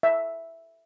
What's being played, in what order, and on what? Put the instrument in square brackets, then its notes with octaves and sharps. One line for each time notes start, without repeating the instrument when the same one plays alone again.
[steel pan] E5